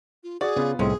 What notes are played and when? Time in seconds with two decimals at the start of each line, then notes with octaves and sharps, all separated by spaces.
0.24 F4
0.41 F#4 G#4 D5
0.56 C#3 B3 F4
0.79 C2 A2 G#3 C4 C#4 G#4